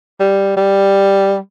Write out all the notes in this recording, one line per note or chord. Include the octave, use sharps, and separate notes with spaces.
G3
G3